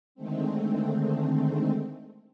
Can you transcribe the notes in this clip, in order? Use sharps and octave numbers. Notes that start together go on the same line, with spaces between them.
D3 D#3 G#3 A3 C4